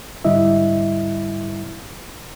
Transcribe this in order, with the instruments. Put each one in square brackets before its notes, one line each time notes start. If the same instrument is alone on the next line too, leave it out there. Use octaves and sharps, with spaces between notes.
[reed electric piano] G#2 D3 G3 E4 D#5 E5